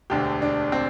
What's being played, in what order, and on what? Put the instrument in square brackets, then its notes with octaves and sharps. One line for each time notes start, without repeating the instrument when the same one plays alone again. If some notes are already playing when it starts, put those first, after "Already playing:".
[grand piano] E1 D2 D3 G4
D4
C4